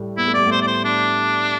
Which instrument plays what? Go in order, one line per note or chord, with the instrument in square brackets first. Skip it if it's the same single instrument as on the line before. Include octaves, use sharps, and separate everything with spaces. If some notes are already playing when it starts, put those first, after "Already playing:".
Already playing: [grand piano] A2 G3 A3
[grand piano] B3 [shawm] E4
[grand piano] A3
[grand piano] G3 [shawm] D5
[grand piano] A2 A3
[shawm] C5
D5
C5
D4